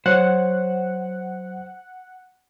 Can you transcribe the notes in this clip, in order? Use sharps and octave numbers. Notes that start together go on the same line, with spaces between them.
F#3 C5 C#5 F#5